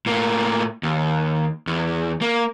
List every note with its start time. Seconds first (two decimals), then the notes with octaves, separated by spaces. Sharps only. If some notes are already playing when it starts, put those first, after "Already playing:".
0.06 A2 A#3
0.83 D#2
1.67 E2
2.21 A#3